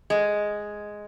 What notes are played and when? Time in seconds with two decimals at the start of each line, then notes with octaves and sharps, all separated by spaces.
0.10 G#3